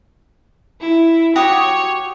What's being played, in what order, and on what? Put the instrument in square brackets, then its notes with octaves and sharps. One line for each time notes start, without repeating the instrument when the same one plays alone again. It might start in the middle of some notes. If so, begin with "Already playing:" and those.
[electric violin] E4
[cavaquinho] F#4 G4 D#6 [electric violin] C#5